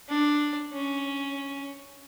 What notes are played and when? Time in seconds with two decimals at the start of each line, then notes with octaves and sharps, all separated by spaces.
0.09 D4
0.73 C#4